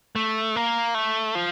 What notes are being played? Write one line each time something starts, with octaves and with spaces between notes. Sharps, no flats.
A3
A#3
A3
F3